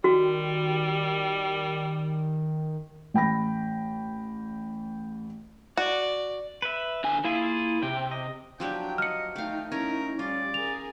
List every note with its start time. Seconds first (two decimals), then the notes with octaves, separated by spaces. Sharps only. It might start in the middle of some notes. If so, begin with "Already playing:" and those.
0.04 D#3 G3 F#4
3.14 A1 G5 B5 A#6
5.77 F#4 D5
6.62 B4 E5
7.04 D3 G#5
7.25 A#3 E4 F4 G#4
7.82 C3 G5
8.11 D#5
8.60 F3 F#3 D4 G4 G5
8.98 D#5 F6 C#7
9.36 A3 D#4 F5 G5
9.72 C#4 D#4 E4 A#4
10.19 G3 C#4 F4 D5
10.54 G#4 A#4 F7